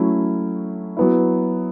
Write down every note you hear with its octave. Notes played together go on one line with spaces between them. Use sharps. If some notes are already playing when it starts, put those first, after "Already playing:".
Already playing: F#3 A3 C#4 E4
F#3 B3 E4